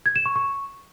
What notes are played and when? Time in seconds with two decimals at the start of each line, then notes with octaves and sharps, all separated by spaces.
0.06 G#6
0.16 E7
0.26 C#6
0.36 C#6